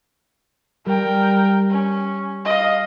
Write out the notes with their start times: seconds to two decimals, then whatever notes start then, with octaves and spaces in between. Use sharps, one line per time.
0.86 G3 A#4 G5
1.70 C#4
2.45 D#5 F5